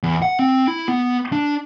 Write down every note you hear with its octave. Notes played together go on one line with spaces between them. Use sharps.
E2
F#5
C4
E4
B3
D4